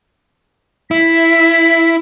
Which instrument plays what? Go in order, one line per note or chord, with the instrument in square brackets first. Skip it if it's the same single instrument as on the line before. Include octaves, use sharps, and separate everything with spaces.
[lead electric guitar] E4 [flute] B6